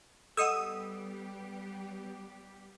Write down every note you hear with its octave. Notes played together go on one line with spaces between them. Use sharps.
G3 B3 G4 A4 D#5 F#5 D#6 E6